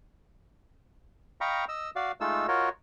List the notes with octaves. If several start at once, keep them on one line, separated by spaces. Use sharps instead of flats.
D#5 F5 G5 A#5 B5 C#6
D#5 E6
F#4 D5 F5
G#3 A3 D#4 F4 A4 E6
F4 F#4 A#4 C#5 D#5